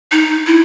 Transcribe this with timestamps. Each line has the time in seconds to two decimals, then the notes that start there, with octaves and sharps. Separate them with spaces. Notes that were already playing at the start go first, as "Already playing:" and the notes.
0.12 D#4
0.47 E4